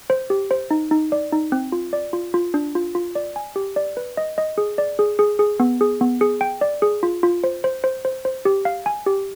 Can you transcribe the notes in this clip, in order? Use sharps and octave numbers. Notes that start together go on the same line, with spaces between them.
C5
G4
C5
D#4
D#4
D5
D#4
C4
F4
D5
F4
F4
D4
F4
F4
D5
G#5
G4
D5
B4
D#5
D#5
G#4
D5
G#4
G#4
G#4
B3
G#4
B3
G#4
G5
D5
G#4
F4
F4
C5
C5
C5
C5
C5
G4
F5
G#5
G4